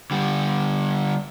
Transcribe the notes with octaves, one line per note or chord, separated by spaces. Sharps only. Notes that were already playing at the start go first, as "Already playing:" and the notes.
D3 G3